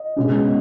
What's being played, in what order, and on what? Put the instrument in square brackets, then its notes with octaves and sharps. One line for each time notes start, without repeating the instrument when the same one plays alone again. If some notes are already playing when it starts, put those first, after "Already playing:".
Already playing: [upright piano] D#5
B2 G#3 C#4